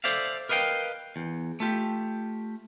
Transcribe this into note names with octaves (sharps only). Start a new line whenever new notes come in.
A4 C5 D5 E5 F5
A#4 B4 D#5 F5 G5
E2
A3 F4 G4